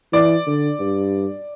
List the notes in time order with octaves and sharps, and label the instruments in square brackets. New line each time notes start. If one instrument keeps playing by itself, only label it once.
[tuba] E3 [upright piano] D5
[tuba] D3
G2